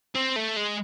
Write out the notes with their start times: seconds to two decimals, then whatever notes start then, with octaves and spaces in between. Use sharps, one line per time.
0.15 C4
0.36 A3
0.56 G#3